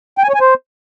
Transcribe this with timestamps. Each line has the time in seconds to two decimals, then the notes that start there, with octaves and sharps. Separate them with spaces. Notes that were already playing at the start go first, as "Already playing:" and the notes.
0.18 G5
0.23 G#5
0.29 C#5
0.35 G#5
0.40 C5